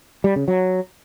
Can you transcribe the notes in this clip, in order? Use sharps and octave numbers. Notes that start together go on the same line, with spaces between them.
G3
C#3
F#3